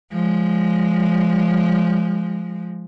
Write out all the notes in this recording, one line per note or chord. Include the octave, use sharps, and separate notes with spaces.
F3 G#3